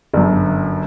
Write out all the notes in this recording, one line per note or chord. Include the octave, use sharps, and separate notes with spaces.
G1 F#2